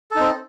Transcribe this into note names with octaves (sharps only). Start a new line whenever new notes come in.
C4 D#4 A4